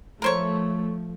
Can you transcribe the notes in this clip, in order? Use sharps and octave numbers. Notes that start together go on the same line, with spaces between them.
F3 A3 A#4 C5 C#5